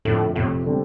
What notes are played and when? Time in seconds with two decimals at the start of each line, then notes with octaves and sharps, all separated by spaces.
0.05 F2 A2 D3 A3
0.35 F1 F2 A2 C3
0.66 D3 G3 C4